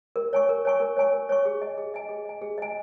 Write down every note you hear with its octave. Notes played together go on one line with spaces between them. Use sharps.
A#4
C#5 G#5 C#6
A#4
C#5 G#5 C#6
A#4
C#5 G#5 C#6
A#4
C#5 G#5 C#6
G#4
D#5 G#5
G#4
D#5 G#5
G#4
D#5 G#5
G#4
D#5 G#5